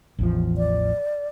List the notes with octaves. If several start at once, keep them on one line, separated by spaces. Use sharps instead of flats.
A1 E2 F3
D5